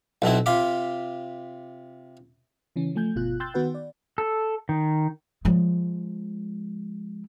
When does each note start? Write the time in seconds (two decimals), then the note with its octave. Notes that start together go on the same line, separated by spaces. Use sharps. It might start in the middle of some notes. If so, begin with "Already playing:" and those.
0.22 B1 B2 C4 E4
0.46 C3 F4 B5 D6
2.76 C#3 E3 C#4
2.95 F3 A3 G#5 G6
3.16 G1 B2 F4 F#6
3.40 G5 C6 E6 F#6 G6 A6
3.54 D#3 B3 F#4 B4 F#5
3.75 D5
4.18 A4
4.69 D#3
5.45 F3 G#3